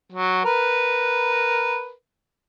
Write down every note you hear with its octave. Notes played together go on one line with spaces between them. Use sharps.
F#3
A#4 B4